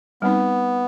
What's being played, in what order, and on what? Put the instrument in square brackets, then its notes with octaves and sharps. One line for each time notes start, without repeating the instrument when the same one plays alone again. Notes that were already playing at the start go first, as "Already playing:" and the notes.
[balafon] G3 C4 D#4 [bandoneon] B3